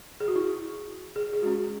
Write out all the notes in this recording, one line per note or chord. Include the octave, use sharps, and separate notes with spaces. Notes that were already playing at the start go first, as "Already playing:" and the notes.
G#4
F#4
E4
G#4
G#4
G#3 C#4 F#4